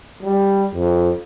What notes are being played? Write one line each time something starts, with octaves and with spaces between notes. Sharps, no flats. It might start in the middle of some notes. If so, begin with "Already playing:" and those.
G3
F2